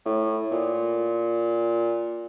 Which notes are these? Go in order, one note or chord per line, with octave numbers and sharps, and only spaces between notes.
A2
A#2